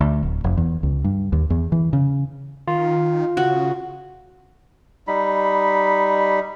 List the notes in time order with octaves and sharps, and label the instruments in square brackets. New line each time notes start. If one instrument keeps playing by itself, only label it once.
[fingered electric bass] D2
D1
F1
E2
C#2
G2
D#2
E2
E3
C#3
[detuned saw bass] D#3 [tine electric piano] F4
[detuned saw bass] C#3 [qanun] F#4
[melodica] G3 D#4 B5